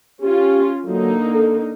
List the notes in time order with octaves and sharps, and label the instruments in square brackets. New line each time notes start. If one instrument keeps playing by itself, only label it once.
[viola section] C#4 F4 [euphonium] G4
[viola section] D3 A#3 D#4 [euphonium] F#3
[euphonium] A4